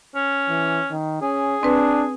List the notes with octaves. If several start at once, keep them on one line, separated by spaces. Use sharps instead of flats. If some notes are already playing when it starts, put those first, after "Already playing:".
C#4
E3
D#3
C#4 G#4
C4 D4 B4